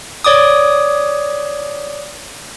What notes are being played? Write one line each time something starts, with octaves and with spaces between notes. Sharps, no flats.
C#5 D5 D6 D#6